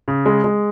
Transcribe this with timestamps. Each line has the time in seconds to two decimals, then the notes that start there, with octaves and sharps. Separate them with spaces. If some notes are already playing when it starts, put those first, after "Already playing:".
0.08 C#3
0.26 G#3
0.44 G#3